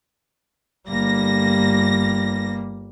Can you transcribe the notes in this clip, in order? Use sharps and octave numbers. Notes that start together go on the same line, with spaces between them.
G1 G3 A#3 A#6